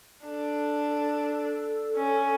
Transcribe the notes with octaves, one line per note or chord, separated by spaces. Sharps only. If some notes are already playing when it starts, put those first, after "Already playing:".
D4 A4
C#4